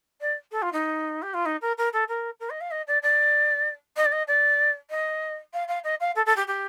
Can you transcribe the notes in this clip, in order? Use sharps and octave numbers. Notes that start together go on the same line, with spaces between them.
D5
A4
F4
D#4
G4
F4
D#4
A#4
A#4
A4
A#4
A#4
D#5
F5
D#5
D5
D5
D#5
D5
D#5
D5
D#5
F5
F5
D#5
F5
A4
A4
G4
G4